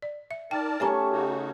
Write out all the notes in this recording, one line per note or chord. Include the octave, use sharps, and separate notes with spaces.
D5
E5
D#4 A#4 D5 G5 A5
A3 C#4 G4 C#5 G#5 A#5 C#6
C#3 D#4 F#4